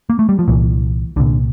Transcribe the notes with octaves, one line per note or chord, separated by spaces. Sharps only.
A#3
A3
G3
F3
C2 A#2 E3
C2 A#2 D3